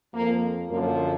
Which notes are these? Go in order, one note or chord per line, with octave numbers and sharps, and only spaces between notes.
F2 F3 A#3
F#2 D3 F3 A#3